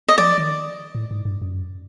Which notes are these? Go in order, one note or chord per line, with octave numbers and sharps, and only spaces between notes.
D#5
F3 D5
D#3
A2
G#2
G2
F#2